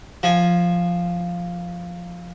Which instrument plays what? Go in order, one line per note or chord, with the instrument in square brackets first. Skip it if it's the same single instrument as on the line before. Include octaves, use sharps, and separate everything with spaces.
[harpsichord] F3 G#5